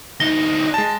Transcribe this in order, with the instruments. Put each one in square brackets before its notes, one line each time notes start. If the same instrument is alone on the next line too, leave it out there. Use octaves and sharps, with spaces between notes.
[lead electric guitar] D2 D#4 [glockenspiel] A#6 G7
[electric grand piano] G#3 A5